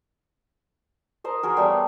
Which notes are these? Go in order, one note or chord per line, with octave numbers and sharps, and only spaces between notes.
A#4 C5 D#5
F#4 G#4 A#4
G3 A3 B3 C#5